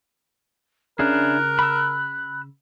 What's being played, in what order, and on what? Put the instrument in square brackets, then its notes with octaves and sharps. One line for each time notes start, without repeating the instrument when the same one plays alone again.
[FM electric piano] C#3 [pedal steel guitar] D4 E4 G#4 [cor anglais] A#4 [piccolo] F#6
[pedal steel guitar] B5 E6